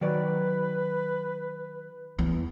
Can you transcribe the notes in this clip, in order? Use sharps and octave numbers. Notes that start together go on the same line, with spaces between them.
D#3 F#3 B4 D5
E2